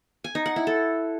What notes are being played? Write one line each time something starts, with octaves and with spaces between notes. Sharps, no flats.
G#5
D#4
F#5
E4
A4